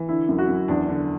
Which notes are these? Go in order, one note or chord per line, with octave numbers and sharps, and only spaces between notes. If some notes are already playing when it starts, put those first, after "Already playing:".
Already playing: E3
D3 E4
F#2
F#4
F#2
E2 D4
D3